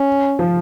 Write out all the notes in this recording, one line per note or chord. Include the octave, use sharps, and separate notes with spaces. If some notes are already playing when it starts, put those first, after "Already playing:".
Already playing: C#4
F3